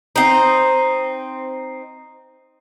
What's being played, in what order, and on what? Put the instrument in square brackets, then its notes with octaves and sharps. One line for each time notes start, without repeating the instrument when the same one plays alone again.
[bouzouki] C4 D#4